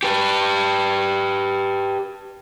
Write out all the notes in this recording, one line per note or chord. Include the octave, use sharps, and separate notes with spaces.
G4 B4